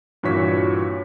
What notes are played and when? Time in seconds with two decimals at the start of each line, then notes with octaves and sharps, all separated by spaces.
0.23 G2 A#2 E3 F#4 C#5 B6